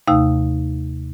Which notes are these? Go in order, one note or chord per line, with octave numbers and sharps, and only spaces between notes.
D#2 C3 A3 D#4 F5 E6